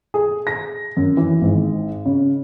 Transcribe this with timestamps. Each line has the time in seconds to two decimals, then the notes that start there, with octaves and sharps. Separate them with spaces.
0.14 G#4
0.47 A#6
0.97 F#2
1.17 E3
1.41 G#1
2.05 C#3